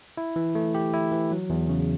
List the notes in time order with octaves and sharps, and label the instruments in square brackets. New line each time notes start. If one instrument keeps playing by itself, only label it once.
[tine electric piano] E4
E3
A3
G4
E4
E3
F#3
E2
C#3